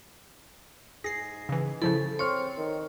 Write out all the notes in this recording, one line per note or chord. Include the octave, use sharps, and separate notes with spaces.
G#2 G#4 A#6 C7
C#3 E3
C#3 F3 E4 A4
C4 C#5 C6 C#6 F6
D#3